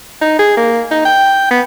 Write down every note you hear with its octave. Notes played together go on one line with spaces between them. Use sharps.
D#4
G#4
A#3
D#4
G5
B3